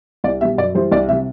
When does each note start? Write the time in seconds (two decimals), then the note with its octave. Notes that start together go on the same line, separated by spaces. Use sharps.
0.24 C2 D5
0.41 B2 G3 E5
0.58 F#2 D5
0.74 E3 G3 C5
0.92 C2 D5
1.08 C3 E5
1.12 G3